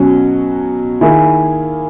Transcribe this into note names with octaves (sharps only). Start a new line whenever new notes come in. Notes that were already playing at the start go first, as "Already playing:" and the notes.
Already playing: B2 F#3 C#4 F#4
D#3 A#3 E4 G#4